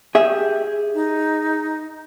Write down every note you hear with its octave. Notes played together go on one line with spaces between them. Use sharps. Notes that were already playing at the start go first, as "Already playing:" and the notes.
G4 G#4 E5
D#4